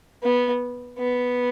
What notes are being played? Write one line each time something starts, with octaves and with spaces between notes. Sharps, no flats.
B3
B3